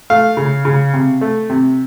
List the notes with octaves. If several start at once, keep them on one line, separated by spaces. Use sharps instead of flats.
A3 F5
C#3
C#3
C3
A3
C3